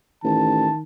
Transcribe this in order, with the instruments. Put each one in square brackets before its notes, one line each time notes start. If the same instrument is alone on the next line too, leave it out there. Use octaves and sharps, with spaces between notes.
[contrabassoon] A1 [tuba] D#3 [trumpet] A5